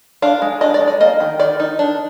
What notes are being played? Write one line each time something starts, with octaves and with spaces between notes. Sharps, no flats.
D4 F5
G#3
D4 D#5
D5
G#3
D5
A#3 D#5
D#3
D#3 D5
D#4
D4